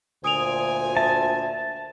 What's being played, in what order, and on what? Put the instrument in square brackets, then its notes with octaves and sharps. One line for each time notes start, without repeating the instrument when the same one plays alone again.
[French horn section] D2 A#2 C5 [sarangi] G#5 [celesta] D#6 D7 F7
[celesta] E5 [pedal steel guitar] A5